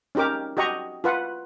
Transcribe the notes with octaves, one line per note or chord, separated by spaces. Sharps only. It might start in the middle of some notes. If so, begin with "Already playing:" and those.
C#4 D#4 G4 A#4 D6
F#4 G4 D#5 A#5 C#6
F4 B4 F#5